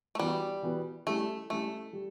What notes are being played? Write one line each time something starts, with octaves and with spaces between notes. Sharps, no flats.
A3
E3 G3 B3 F#4
E3 B3 F#4
G3 A3 C#4 E4
G3 A3 C#4 E4
G3